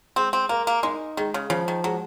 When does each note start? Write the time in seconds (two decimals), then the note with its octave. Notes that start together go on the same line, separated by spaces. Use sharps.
0.16 G#3 C4
0.33 C4
0.49 A#3 A#4
0.67 A#3
0.83 G#3 D#4
1.17 D#3 G#3
1.34 C#3
1.50 C#3 F3
1.68 D#3
1.84 F#3 G#3